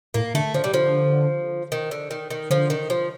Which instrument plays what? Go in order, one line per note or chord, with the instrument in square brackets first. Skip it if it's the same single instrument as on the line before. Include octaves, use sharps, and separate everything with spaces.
[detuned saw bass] A2 [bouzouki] A#3
[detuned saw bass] D3 [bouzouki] A3
[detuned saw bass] D3 [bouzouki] F3
[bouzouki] G3
[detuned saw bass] D3 [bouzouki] F3
[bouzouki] D#3
D3
D#3
D#3
[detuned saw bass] D3 [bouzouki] F3
[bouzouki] D#3
F3